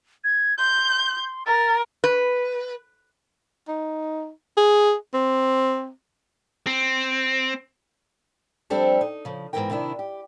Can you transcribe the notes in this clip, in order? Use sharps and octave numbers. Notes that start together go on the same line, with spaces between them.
G#6
C6 G6
A#4 A6
B4
D#4
G#4
C4
C4
F3 G3 C4 D4 G4 A4
D#4
C#3 F3
G#2 D#3 E3 B3 A#4 G5
C3 D#3 D4 E4
G4